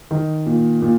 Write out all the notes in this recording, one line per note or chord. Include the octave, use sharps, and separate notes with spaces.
D#3
A#2
A#2